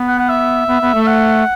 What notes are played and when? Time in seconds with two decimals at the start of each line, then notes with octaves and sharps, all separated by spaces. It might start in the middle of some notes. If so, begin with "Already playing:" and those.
Already playing: B3
0.08 F#5
0.19 F#5
0.29 E5
0.67 B3
0.82 B3
0.95 A3
1.07 F#5